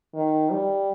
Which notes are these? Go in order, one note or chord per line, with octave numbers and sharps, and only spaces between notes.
D#3
G3